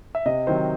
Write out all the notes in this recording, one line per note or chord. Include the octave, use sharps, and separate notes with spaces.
E5
C3 D#5
D#3 F#3 C4 C5